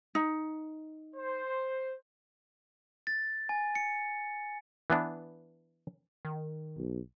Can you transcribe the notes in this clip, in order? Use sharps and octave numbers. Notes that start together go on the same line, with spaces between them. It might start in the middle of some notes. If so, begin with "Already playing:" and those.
D#4
C5
A6
G#5
C#7
E3 B3 D4
D#3
B1